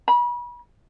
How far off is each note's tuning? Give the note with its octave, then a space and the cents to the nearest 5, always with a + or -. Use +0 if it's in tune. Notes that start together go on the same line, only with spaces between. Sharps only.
B5 -35